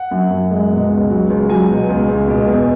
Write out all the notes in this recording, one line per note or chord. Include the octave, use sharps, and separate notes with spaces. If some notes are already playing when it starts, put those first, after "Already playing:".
Already playing: F#5
F#2
F#2
G#3
B2
C#2
F#3
C#2
F#3 G#5
B2
C#2
C#2
B2
E2